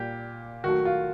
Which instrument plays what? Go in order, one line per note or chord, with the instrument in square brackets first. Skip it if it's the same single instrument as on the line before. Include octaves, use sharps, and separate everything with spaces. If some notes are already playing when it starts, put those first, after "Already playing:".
Already playing: [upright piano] A#2 G3 A#3 G4
D#3 F#3 A3 F#4
F4